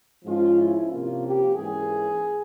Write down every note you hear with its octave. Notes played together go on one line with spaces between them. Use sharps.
G#2 F3 G#3 C#4 F4
E4
C3 F3 A#3 C#4 F4
G4
G#2 E3 A#3 C#4 G#4